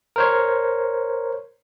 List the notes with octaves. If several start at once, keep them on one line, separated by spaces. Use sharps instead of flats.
A#4 C5 C#5